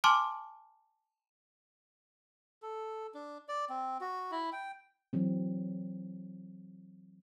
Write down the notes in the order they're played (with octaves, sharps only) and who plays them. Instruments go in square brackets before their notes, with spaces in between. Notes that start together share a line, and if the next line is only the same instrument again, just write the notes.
[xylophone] G#5 A5 C6 D6 F6
[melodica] A4
D4
D5
C4
F#4
E4
G5
[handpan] E3 F#3 C4